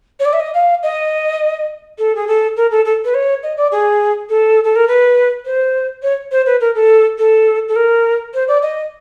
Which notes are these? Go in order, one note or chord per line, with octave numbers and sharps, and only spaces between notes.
C#5
D5
E5
D#5
F5
D#5
A4
G#4
A4
A#4
A4
A4
B4
C#5
D#5
D5
G#4
A4
A4
A#4
B4
C5
C#5
C5
B4
A#4
A4
A4
A4
A#4
C5
D5
D#5